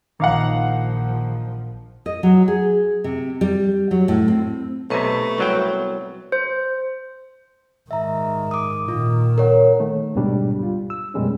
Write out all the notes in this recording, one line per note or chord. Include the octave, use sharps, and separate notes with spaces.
A#1 D#3 F3 D#4 F5 F#5 D6
D#5
F#3
G#4
C3
G3
F#3
A2
C4
B1 C3 A3 B3 B4 C#6
C2 F#3 G5
C5
G#2 D#3 E5 A#5
D6 D#6
A#2 D#3 F4
A#4 C#5 F#5
D#3 A3
D2 G#2 B2 G3 D4
G3 F4
E6
F#2 B2 G3 G#3 C#4